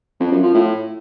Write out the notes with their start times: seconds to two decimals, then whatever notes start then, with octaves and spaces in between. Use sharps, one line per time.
0.20 F2
0.32 F#2
0.43 F3
0.54 A2